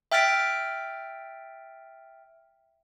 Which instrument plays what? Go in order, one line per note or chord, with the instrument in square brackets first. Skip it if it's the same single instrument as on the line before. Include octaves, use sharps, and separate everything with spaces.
[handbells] E5 G5 F6 A6 B6 D7